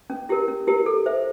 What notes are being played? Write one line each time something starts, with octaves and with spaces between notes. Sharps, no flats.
C#4
E4 G4 A#4
C#4
E4 G4 A#4
A4
C5 E5